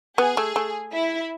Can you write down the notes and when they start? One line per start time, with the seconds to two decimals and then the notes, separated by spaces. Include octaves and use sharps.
0.18 B3 G#4
0.37 A3
0.56 A3
0.92 E4